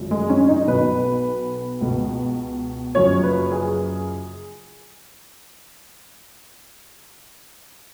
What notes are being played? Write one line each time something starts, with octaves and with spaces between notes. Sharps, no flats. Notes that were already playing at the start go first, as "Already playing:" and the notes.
Already playing: G#1 F#2 C#3 F3
G#3
C#4
D#4
B1 B2 B4
C#2 B2
F#1 F#2 C#3 F3 C#5
B4
G#4